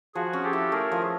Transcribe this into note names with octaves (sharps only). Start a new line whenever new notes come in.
F3 F#4 G#4
C#4
G4 A4
E4
A3 G#4 A#4
F3